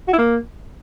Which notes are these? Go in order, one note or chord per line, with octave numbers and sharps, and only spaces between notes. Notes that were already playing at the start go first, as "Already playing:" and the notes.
F#4
E4
A#3